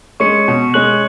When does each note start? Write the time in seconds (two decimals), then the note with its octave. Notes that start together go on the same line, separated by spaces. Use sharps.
0.20 G#3 C#4 C#6 C#7
0.48 B2
0.74 G#3 C#4 F#6 F#7